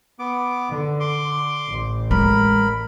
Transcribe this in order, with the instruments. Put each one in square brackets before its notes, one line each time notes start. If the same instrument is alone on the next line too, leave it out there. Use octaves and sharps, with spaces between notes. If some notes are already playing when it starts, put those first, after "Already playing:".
[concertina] B3 D6
[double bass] D3
[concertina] C6 D6
[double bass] A1
[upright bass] G#3 [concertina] A#4 B5